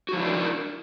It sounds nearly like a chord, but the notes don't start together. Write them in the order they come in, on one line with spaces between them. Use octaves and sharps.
F#4 F3 E4 D4 A#4